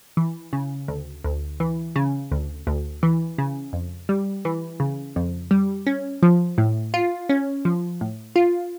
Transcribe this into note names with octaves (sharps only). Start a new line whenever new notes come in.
E3
C#3
D2
D2
E3
C#3
D2
D2
E3
C#3
F2
G3
E3
C#3
F2
G3
C#4
F3
A2
F4
C#4
F3
A2
F4